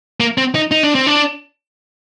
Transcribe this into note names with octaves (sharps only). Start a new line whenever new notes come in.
A#3
C4
D#4
D#4
D4
C4
D4